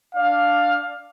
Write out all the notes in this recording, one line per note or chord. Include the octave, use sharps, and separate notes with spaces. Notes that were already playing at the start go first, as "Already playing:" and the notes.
D4 D5 F5